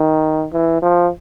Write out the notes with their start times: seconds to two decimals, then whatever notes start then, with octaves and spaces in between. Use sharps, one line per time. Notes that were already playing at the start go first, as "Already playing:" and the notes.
Already playing: D#3
0.53 E3
0.82 F3